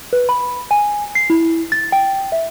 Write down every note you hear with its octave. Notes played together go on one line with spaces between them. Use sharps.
B4
B5
G#5
C7
E4
A6
G5
E5